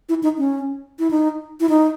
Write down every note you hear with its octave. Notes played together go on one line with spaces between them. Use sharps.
E4
D#4
C#4
E4
D#4
E4
D#4